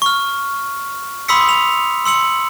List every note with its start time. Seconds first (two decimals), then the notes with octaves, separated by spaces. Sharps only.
0.02 C#6 F6
1.28 B5 C6 D#6 E6 B6 C#7
1.49 F7
2.05 C6 E6 C#7 F#7